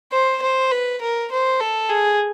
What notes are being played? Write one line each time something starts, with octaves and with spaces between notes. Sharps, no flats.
C5
C5
B4
A#4
C5
A4
G#4